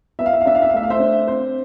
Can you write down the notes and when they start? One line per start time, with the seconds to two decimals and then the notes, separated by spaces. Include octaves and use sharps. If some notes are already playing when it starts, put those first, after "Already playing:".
0.19 B3 E5
0.26 F5
0.33 E5
0.41 F5
0.45 D4 E5
0.55 F5
0.62 E5
0.69 F5
0.73 A3 E5
0.83 F5
0.90 C5 E5
0.99 D4
1.27 C4 C5